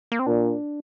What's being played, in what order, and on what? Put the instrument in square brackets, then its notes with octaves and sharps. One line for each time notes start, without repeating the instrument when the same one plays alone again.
[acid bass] A#3
C4
[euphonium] A#2 [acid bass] D4